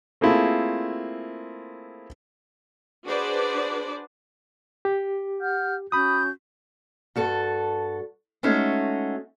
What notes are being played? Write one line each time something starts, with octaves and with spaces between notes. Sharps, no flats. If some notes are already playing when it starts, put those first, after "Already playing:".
A3 A#3 C4 E4 F4 G#4
D4 F#4 G#4 B4 C5 D5
G4
F#5 F6 G6
C#4 F#4 B5 D#6 G6
G2 F#4 A4
G#3 A3 C#4 D#4 F#4